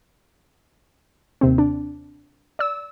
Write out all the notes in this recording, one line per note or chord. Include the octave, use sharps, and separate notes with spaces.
D#2 C3 C4
D4
D5 E6